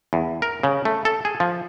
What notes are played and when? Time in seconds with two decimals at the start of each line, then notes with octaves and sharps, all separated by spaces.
0.13 E2
0.42 A#4
0.63 C#3
0.85 A3
1.05 A4
1.25 G#4
1.40 F3